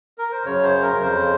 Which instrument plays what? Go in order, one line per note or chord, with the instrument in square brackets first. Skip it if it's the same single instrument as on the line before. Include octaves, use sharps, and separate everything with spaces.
[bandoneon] A#4
C5
F#2 C#3 C#5
C5
A#4
F2 C#3 C5